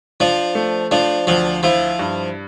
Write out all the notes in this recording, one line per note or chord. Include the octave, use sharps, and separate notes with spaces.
F3 D4
A3
F3 D4
D2 F3
F3 E4
G2